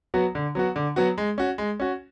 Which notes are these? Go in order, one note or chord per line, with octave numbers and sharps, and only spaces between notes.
F#3 B3 F#4
D3
F#3 B3 F#4
D3
F#3 B3 F#4
G#3
C#4 F#4
G#3
C#4 F#4